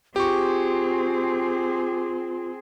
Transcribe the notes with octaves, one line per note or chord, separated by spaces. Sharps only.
C4 F4 G4 G#4 C#6